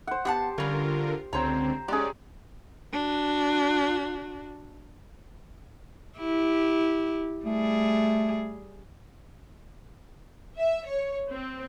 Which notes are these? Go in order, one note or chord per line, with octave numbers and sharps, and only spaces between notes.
C5 F#5
B3 G4 F#5 A5
D3 G3 C#4 F4 A#4
C#2 D3 C4 C5 C#5 A#5
G#3 C#4 G4 G#4 D5
D4 F#4
E4 G4
G3 A3 G#4
E5
C#5
C4